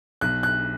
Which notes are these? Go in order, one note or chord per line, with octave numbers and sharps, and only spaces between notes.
B1 F#6
F#6